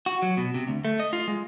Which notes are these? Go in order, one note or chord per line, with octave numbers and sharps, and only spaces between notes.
F#4
F#3
B2
C3
D2
A3
D#5
F4
G#3